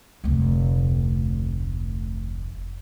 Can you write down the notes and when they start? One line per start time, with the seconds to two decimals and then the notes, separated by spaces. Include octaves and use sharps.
0.24 F1 D2